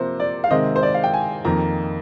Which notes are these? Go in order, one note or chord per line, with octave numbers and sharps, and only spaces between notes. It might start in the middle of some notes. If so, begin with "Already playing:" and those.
Already playing: C3 F3 A#3 C5
D5
F5
C3 D#3 G#3 C4 D#5
C5
D5
F5
G5
G#5
F2 D#3 A#3 A#5